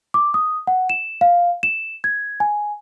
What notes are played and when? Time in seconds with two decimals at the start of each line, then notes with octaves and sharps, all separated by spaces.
0.14 D6
0.34 D#6
0.67 F#5
0.90 E7
1.21 F5
1.63 E7
2.04 G#6
2.40 G#5